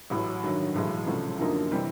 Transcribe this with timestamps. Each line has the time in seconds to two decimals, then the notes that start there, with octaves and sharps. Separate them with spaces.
0.10 A1 A2 F#3
0.43 G2 D#3 F#3
0.74 B1 A2 E3 G#3
1.07 C2 C3 F3 A3 C#4
1.39 F#2 D3 F3 A#3 D#4
1.71 C3 E3 G3 C4